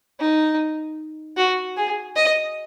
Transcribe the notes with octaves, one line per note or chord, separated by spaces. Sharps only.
D#4
F#4
G#4
D#5